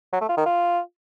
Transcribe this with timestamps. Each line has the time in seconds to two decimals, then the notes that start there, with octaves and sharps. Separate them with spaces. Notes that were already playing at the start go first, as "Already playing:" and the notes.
0.13 F#3
0.21 A3
0.29 F4
0.37 D#3
0.46 F4